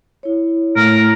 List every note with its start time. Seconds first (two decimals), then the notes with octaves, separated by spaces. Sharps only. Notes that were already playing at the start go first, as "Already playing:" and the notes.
0.23 E4 C#5
0.76 A2 A#4